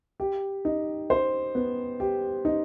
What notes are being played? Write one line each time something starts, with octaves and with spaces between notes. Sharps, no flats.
G4
D#4
C5
B3
G4
D#4